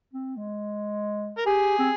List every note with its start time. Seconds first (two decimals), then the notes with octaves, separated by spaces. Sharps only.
0.14 C4
0.36 G#3
1.37 A#4
1.46 G4 G#4
1.79 C4